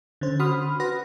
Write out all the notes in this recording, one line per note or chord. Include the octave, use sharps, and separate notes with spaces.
D3 C#4 C5
F#4 B5 C6 D#6 F6
F#4 B4 F#5 A#6